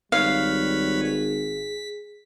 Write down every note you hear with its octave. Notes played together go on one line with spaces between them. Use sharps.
G#1 G3 B4 C#5 F5 B5
G#4 B6